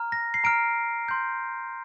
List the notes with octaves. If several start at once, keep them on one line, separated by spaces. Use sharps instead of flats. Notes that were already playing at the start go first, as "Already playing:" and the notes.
Already playing: A#5 F6
A#6
C7
A#5 F6 D7
C6 G6